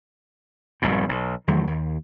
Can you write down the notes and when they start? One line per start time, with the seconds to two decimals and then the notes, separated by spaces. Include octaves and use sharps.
0.82 F1 C2 G#2 B2
1.09 B1
1.48 E2 D#3 F#3 A3
1.67 D#2